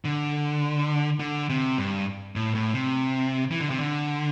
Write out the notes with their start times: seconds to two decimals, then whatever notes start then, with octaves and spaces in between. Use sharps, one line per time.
0.05 D3
1.20 D3
1.49 C3
1.78 G2
2.36 A2
2.55 A2
2.74 C3
3.51 E3
3.61 D3
3.70 C3
3.80 D3